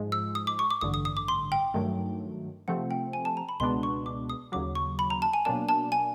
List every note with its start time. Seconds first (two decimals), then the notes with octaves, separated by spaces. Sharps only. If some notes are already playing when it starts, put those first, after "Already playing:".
Already playing: G#2 F3 G#3
0.12 E6
0.35 D#6
0.47 D6
0.59 C#6
0.70 D6
0.81 A1 G2 D3 D#6
0.94 D#6
1.05 D#6
1.17 D6
1.28 C6
1.52 G5
1.74 G2 D#3 F#3 A3
2.68 C3 F3 A3 C4 F#5
2.91 G5
3.13 G#5
3.25 A5
3.37 A#5
3.49 B5
3.60 C#2 B2 G#3 B3 D4 C6
3.83 C#6
4.06 D6
4.30 D#6
4.52 D#2 C#3 F#3 D6
4.75 C#6
4.99 B5
5.10 A#5
5.22 A5
5.33 G#5
5.45 B2 F#3 A#3 D4 A5
5.69 A5
5.92 G#5